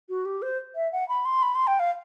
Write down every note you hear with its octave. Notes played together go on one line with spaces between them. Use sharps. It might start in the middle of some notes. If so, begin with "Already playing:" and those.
F#4
G4
C5
E5
F#5
B5
C6
B5
C6
G5
F5